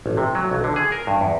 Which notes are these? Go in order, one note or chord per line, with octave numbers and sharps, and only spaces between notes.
A1
C3
F#3
B1
D3
G#4
A#4
G2
E2